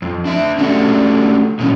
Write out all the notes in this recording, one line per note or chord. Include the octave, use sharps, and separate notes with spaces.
F2
D4 E5
A3 C#4 D4 F#4 G4 A4
A#2 E3 F#3 C#4